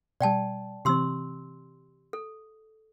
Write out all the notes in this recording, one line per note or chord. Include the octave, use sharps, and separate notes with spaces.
B2 G3 D5 G5 A5
C3 E3 C4 G4 C6 E6
A4